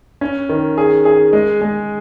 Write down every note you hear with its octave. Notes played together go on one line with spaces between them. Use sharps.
C#4
D#3
G#4
G#4
G#3
G#3